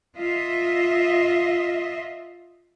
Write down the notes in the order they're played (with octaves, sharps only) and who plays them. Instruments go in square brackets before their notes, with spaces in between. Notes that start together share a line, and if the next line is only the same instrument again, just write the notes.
[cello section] F4 D#5 E5